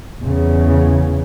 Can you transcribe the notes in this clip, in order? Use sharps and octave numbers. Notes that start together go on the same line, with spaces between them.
E2 C#3